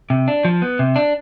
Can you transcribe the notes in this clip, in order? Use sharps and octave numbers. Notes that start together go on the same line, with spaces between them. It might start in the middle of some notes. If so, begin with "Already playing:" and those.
C3
D4
F3
B3
C3
D4